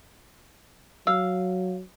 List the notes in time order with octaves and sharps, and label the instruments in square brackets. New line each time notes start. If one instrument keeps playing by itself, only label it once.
[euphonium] F#3 [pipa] F5 [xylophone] E6